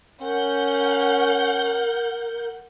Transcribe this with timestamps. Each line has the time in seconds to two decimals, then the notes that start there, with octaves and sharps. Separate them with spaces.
0.21 C#4 A#4 F#5 G6